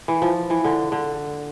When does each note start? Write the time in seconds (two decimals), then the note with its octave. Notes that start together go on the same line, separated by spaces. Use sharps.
0.08 E3
0.22 F3
0.50 E3
0.64 D3
0.92 D3